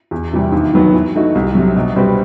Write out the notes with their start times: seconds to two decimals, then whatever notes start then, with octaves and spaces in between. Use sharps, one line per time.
0.11 E2
0.33 C3 E3 G3
0.52 D#2
0.74 D#3 F#3 B3
0.93 E3
1.15 A3 D#4 F#4
1.35 C2
1.55 C3 F#3
1.76 B2
1.96 G3 C4 F#4 B4